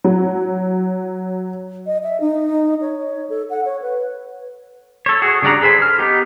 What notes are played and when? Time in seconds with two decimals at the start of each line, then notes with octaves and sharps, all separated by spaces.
0.04 F#3
1.86 D#5
2.03 E5
2.21 D#4
2.81 C#5
3.30 A4
3.50 F#5
3.65 C#5
3.82 B4
5.06 A4 C#5
5.22 F#4 G#4
5.42 C#3 G3 D4 F#5 A#5
5.61 G#4 A4 B4 C5 G#5
5.82 F6
5.98 B3 D#4 G4